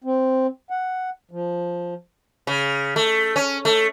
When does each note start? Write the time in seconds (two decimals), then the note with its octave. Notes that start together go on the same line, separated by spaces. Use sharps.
0.04 C4
0.70 F#5
1.31 F3
2.47 C#3
2.96 A3
3.36 C#4
3.65 A3